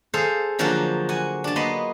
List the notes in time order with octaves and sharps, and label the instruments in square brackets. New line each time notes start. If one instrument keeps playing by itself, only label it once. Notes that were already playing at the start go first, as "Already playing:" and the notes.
[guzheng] G#4 A4 C5 F5
D3 F3 F#3 A#3 F4 F#4
F#4 G#5
D4 A5
A#3 B3 D#5 B5 C6